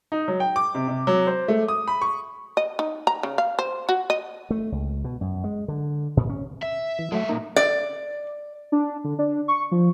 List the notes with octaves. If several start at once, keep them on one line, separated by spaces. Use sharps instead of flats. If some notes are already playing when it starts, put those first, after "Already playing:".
D#4
F#3
G5
D6
C3
C3
F#3
C5
A3
D#6
B5
C#6
D#5
D#4
A#5
C#3
F5
C5
F#4
D#5
A3
C#2
B2
F#2
G#3
D3
A#2
C#4
E5
E3
F#3 G#3 A3 E5
B1 A#2 A#3 D#4
D5
D4
D3
D4
C#6
F3